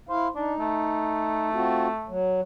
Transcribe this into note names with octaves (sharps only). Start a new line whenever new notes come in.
E4 C5 F5
D4 D#4
A3
C4 F4 F#4
F#3